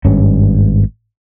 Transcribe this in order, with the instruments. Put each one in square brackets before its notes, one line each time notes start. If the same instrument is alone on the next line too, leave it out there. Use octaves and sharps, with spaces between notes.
[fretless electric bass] G#1 G2 C#4